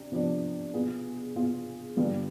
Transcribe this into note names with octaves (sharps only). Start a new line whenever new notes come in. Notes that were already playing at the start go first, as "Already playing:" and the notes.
Already playing: C3 D4 G4
C3 F3 B3 D4 G4
B2 B3 F4 G#4
B2 B3 F4 G#4
G2 D3 G3 B3 F4